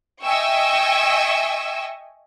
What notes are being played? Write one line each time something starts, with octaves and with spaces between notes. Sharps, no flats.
D#5 E5 G5 G#5 C#6 E6